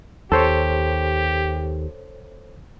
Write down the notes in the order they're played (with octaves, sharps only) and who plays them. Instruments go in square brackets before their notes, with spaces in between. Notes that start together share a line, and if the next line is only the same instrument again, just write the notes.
[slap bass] D#2 [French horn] G4 [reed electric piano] A4 C5 C#5